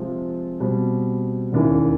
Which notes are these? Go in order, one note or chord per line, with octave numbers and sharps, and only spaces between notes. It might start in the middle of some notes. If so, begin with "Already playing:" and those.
Already playing: C3 F3 G#3 C4 F4
B2 G3 C4
E1 D#2 C#3 E3